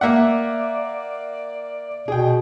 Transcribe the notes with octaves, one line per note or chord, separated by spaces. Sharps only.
A#3 D5 E5 F#5
B2 G#4 G5